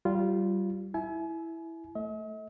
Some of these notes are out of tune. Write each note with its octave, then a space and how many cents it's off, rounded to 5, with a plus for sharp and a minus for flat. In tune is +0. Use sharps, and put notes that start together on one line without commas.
G3 -25 F4 -15
E4 -5 G#5 +35
A3 +5 D#5 +45